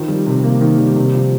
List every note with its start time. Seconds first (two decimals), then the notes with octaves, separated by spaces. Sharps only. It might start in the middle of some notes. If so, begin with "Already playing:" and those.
Already playing: D#3 F3
0.08 G3
0.26 C3
0.44 A#3
0.61 D#3
0.78 G3
0.96 C3
1.14 F3